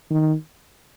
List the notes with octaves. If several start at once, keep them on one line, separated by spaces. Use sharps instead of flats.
D#3